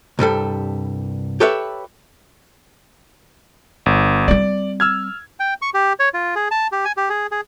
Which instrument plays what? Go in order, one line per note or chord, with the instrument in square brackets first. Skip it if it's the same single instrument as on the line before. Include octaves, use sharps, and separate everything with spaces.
[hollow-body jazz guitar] C2 G2 G3 A4
G4 A4 B4 C#5 E5
[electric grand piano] G1
[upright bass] G3 C4 [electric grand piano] D5
[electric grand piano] E6 F6 G#6
[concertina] G5
C#6
G4
C#5
F4
G#4
A5
G4
G#5
G4
G#4
G#4